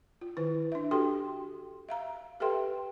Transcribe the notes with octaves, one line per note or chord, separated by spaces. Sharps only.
F4
D#3 E4 B4
D4 E5
F#4 G4 A4 G5 C6
E5 F5 A#5
G4 A4 B4 E5 G5 C6